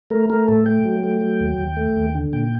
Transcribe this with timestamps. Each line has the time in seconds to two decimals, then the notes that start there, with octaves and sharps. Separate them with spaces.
0.10 A3 A#4
0.30 A3 A#4
0.47 A2 A4
0.66 A3 G5
0.85 F#3
1.03 A3
1.21 F#3
1.40 D#2
1.58 D#2
1.77 A3
1.96 D#2
2.15 D3
2.33 A#2 G5